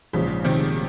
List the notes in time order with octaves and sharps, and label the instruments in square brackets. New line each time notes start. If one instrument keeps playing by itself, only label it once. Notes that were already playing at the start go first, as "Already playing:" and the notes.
[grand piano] A#1 G#2 F3 [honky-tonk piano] C#3
[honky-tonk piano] C3 D#3